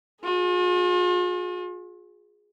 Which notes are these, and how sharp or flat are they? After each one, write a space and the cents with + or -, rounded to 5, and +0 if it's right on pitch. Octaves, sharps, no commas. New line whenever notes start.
F4 +45 G#4 +0